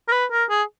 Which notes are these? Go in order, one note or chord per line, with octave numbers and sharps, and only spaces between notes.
A#4
B4
A#4
G#4